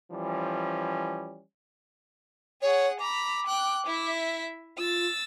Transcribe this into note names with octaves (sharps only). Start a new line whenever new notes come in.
E3 F3 G3 C#4
G#4 C#5 F#5
A#5 B5 D6
G5 F#6
E4 E5
F4 E6 A6